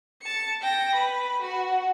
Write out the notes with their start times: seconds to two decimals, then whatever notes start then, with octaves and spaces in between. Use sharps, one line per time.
0.22 A5 C#7
0.62 G5 A#6
0.95 B4 B5
1.42 F#4 F#5